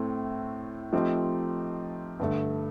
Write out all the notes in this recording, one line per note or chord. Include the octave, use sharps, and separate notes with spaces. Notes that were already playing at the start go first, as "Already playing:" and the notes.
Already playing: A2 A3 C4
F3 A3 C4 D#4 G4
G2 D3 A3